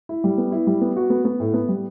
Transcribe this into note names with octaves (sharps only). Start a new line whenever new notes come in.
E4
G3
B3
E4
G3
B3
F#4
B3
B3
A2
B3
G3